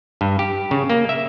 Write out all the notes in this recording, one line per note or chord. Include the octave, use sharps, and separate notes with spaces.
G2
G4
C#3
A#3
E5